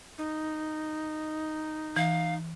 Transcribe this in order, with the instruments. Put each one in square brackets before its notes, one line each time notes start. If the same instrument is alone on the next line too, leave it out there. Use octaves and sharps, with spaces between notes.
[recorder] D#4
[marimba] E3 [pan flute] F5